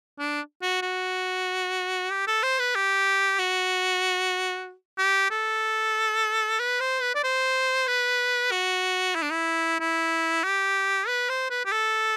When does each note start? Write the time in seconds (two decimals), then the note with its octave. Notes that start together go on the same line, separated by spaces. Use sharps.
0.19 D4
0.62 F#4
0.82 F#4
2.11 G4
2.27 A4
2.43 C5
2.59 B4
2.75 G4
3.39 F#4
4.99 G4
5.31 A4
6.60 B4
6.80 C5
7.02 B4
7.15 D5
7.24 C5
7.88 B4
8.51 F#4
9.15 E4
9.22 D4
9.31 E4
9.80 E4
10.44 G4
11.08 B4
11.29 C5
11.50 B4
11.65 G4
11.72 A4